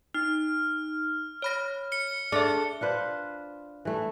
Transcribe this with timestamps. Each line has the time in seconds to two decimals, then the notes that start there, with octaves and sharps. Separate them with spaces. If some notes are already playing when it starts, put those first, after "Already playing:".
0.14 D#4 F6
1.42 C#5 B5 A#6
1.92 C#7 G7
2.32 D4 G#4 A4 E5
2.81 D4 F4 B4 C5
3.85 E3 A3